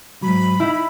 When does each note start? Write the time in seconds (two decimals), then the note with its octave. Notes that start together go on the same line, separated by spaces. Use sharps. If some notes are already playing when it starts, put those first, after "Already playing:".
0.22 G#2 F#3 B5
0.60 D#4 E4